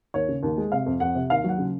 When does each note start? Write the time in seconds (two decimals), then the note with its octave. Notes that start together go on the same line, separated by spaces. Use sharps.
0.14 D#2 C#5
0.28 C#3
0.43 D#2
0.57 G#3
0.72 C3 F5
0.86 F2
1.00 F2 F#5
1.15 C3
1.30 D#2 F5
1.44 F#3 F#5
1.58 C#3